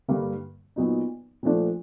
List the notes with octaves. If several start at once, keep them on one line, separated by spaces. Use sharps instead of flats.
G2 D3 G3 A#3
A#2 F#3 B3 D#4
A#2 F3 A3 D4